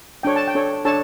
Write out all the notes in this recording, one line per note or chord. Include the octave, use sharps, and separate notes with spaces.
D4 A4 C#5 G5
A5
G5
D4 A4 C#5
D4 A4 C#5 A5